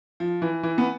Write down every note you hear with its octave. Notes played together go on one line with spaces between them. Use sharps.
F3
E3
E3
B3